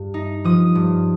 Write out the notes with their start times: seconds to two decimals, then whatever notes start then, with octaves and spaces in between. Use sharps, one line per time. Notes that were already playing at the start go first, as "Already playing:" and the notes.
Already playing: G2
0.14 D#4
0.44 F3 D#6
0.75 G2